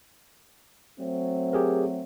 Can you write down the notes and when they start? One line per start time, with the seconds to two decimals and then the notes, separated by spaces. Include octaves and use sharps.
0.99 F#3 A3 C4
1.53 G4 G#4 A#4